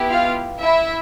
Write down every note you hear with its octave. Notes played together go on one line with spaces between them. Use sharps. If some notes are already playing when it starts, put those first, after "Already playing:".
Already playing: B3 E4 G4
F4 F5
E4 E5